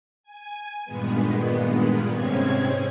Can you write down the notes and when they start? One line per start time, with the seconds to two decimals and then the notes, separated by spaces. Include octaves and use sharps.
0.23 G#5
0.85 G2 A#2 D#3 G#3 B3
2.13 G#2 C3 G#3 C4 C#4 G#6